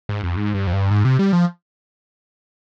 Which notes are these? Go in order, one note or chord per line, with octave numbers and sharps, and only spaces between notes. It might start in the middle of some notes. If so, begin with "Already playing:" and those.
G#2
F2
G#2
G2
F2
G2
G#2
C3
G3
F3